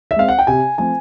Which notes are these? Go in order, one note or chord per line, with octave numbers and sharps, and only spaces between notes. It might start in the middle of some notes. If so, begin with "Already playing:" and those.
E5
G#3 C4 F5
F#5
G5
C3 G#5
F3 A3 C4 G#5